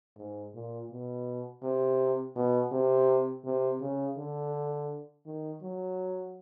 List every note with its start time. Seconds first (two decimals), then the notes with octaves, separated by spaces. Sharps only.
0.17 G#2
0.54 A#2
0.91 B2
1.63 C3
2.36 B2
2.72 C3
3.45 C3
3.81 C#3
4.17 D3
5.26 D#3
5.62 F#3